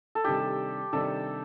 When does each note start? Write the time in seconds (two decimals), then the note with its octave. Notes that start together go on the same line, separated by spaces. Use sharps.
0.15 A4
0.24 C3 D#3 G3 D4 G4
0.93 C3 D#3 G3 D4 A4